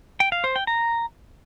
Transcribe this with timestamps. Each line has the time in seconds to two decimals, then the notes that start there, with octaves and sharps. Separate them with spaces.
0.20 G5
0.32 F5
0.44 C5
0.56 G5
0.67 A#5